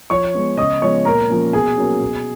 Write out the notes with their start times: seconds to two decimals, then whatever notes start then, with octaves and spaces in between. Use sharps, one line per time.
0.10 F3 C#5 C#6
0.34 G#3 B3
0.57 C#3 D#5 D#6
0.81 F3 G#3 B3 C#5 C#6
1.05 A#2 A#4 A#5
1.29 F3 A#3 C#4
1.53 B2 G#4 G#5
1.77 F#3 A#3 C#4
2.01 B2